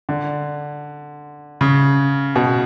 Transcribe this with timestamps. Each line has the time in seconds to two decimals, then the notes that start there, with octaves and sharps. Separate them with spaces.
0.09 D3
1.61 C#3
2.36 B2